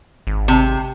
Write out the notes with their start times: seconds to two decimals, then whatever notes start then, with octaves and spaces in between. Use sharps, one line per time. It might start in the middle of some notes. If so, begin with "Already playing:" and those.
0.27 G#1
0.48 C3